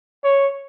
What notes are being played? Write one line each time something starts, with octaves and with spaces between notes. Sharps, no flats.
C#5